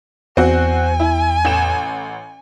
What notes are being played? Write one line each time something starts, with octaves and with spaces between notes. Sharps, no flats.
E2 C4 F#4 G#5
E4
A1 E7